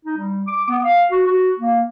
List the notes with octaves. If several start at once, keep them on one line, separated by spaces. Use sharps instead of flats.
D#4
G3
D6
B3
F5
F#4
F#4
A#3